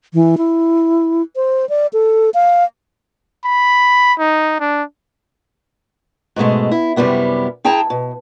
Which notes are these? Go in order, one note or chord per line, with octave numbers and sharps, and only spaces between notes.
E3
E4
C5
D5
A4
F5
B5
D#4
D4
G#2 B2 G#3 A3
E4
F#2 C3 G3 B3 E4
E4 G#4 G5 A5 A#5
B2